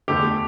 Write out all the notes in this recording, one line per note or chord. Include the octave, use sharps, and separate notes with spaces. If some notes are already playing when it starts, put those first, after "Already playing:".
E2 D3 A3 G4